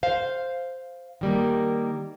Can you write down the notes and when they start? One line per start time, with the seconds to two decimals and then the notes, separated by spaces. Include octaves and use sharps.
0.03 C5 F5
1.21 D#3 G3 A#3